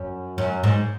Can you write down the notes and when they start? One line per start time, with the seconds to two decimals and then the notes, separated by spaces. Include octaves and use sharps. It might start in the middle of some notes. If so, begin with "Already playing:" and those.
Already playing: F#2
0.38 F#2
0.63 G#2